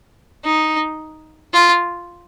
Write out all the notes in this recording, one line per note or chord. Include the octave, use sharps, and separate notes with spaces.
D#4
F4